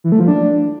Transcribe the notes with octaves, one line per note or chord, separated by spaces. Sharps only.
E3
A3
F3
D4